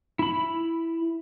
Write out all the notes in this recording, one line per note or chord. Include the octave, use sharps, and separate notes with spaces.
E4 B5